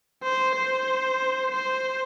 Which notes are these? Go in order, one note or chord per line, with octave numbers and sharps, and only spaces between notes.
C5
C5
C5